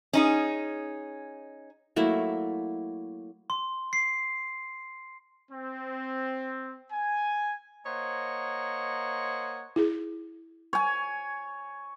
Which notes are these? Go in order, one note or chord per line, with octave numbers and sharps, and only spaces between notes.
C#4 D#4 G#4
F#3 A3 A#3 E4
C6
C7
C4
G#5
A#3 C5 C#5 D#5 F#5 A#5
E4 G#4
C#5 G#5